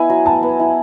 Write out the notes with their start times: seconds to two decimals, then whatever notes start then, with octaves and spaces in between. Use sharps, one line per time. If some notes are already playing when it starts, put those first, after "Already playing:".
Already playing: B3 E4 G#5
0.10 F#3
0.26 F#3 A5
0.43 B3
0.59 E4